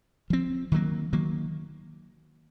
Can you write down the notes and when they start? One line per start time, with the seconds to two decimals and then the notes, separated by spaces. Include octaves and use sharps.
0.30 F3 C4
0.72 D#3 F#3 A#3
1.13 D#3 F#3 A#3